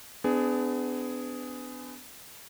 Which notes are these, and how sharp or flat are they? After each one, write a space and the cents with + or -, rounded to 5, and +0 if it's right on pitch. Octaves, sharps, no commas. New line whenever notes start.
B3 +35 D4 +0 G#4 +5